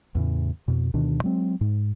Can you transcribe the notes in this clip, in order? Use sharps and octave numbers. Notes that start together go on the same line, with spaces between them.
E2 A2 C#3
F2 B2
D2 B2 D#3 D4
F#3 G#3 C4
G#2